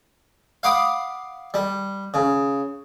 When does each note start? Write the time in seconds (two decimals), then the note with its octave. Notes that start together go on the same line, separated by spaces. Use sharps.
0.63 F5 F#5 B5 D6 D#6
1.54 G3
2.14 C#3